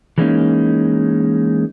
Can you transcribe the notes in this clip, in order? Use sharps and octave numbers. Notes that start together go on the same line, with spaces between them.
E3 F#3 G#3 A#3 C#4 D#4